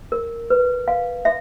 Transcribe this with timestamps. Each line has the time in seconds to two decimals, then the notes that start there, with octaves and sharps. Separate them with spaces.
0.12 A#4
0.50 B4
0.88 F5
1.25 E5